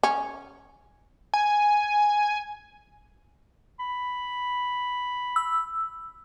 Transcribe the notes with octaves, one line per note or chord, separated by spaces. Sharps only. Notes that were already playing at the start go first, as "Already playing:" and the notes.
C#4
G#5
B5
E6